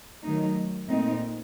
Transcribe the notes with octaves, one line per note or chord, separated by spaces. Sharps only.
D#3 F#3 A3 D#4
A#2 A3 C4 D#4